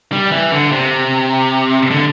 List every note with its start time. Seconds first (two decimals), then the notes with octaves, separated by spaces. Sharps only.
0.12 G3
0.32 E3
0.52 D3
0.72 C3
1.91 D3